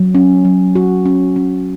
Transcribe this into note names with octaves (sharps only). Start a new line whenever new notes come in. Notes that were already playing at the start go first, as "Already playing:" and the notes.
Already playing: F#3
C#4
F#3
F#4
C#4
C#4